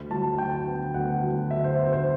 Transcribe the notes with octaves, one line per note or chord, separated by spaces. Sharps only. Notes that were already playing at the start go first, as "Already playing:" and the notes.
Already playing: D2
F#3 A5
D3 G5
B3
D2 F#5
F#3
D3 E5
C5
B3 C5
C5